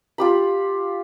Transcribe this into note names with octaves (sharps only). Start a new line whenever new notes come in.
F4 G4 B5